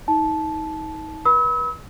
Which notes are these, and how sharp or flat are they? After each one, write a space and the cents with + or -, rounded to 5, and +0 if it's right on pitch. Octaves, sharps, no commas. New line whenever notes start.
D#4 +30 A5 -15
B4 -40 B5 +0 E6 -40